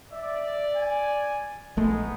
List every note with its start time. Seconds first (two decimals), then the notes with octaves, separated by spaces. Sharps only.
0.12 D5 E5
0.75 G#5
1.77 A#1 G#3 A3 B3 D#4